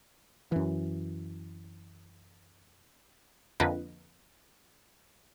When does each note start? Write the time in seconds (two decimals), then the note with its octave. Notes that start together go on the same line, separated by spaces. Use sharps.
0.52 F#2 E3
3.60 F2 D3 A#3 B4 D#5